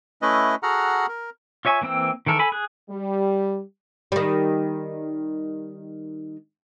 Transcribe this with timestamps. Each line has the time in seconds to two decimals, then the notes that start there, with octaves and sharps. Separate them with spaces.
0.22 A3 C#4 E4 B4 D#5
0.63 F#4 G#4 A4 F#5 A#5 F6
1.09 A#4
1.65 F4 C#5 E5 G#5 C#6
1.81 E3 A#3 C4 G5 E6
2.26 D#3 E3 A4 A#4
2.39 A4 G#5 B5
2.52 G#4 F#6
2.90 G3
4.12 D#3 G3